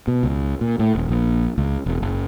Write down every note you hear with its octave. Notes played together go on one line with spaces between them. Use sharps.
B2
C#2
A#2
A2
D#1
A#1
C#2
E1
F#1